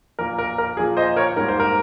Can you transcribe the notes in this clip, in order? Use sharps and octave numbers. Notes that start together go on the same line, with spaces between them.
A#2 F3 A#3 A#4
A#4
A#4
A#2 F3 A#3 G#4
C5 D#5
A#4 C#5
G#2 G3 A#3 A#4
C5
A#4